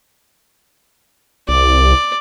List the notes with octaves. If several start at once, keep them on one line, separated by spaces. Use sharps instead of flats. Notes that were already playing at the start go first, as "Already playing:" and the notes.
C2 D5